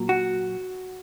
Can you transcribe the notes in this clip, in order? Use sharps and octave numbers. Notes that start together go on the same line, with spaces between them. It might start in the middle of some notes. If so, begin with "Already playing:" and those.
Already playing: A#2 F#3
F#4